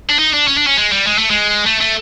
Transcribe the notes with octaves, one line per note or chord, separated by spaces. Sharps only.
D4
D#4
D4
C#4
D4
C#4
G#3
G3
G#3
A3
G#3
A3
A3